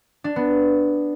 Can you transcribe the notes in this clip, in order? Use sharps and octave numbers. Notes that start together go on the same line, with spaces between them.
D4
B3